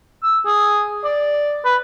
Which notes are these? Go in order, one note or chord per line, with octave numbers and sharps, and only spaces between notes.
E6
G#4
D5
B4